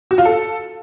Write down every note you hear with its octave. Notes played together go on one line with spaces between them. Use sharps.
F#4
F4
A4